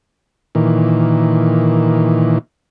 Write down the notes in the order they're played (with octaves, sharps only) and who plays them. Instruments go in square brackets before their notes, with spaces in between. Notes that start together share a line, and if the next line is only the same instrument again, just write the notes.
[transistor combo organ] A#2 D#3 E3